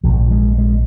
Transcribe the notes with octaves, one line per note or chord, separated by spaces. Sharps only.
A#1 G#2 F3
G#3
G#3